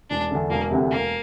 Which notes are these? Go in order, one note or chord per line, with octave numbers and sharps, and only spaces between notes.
E1 D4
E2 D3
E1 A#3
D2 C3 E3
E1 A#3